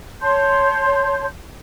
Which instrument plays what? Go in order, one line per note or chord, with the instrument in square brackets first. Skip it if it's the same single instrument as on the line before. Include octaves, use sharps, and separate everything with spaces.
[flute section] C#5 A5 C6 G6